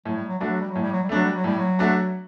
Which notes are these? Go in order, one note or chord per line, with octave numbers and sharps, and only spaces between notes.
A2 F#3
G3
F#3
G3 A3 D4 F#4
F#3
G3
A2 F#3
G3
F#3
G3
F#3 A3 D4 F#4
G3
F#3
A2 G3
F#3
A3 D4 F#4